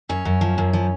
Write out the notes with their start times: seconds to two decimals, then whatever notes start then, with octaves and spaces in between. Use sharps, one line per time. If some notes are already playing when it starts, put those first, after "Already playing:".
0.09 F#2 C#4
0.25 F#2
0.41 F3
0.58 F#2
0.73 F3